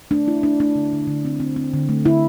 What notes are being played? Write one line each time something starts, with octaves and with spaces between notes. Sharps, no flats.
A3 D4
A3 E4
A3 D4
A3 D4
D3
D3
D3
C4
C4
C4
D3
A3
D3 E4